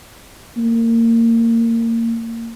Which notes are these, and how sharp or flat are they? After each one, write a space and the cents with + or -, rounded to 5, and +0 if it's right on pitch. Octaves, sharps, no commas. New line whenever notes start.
A#3 -25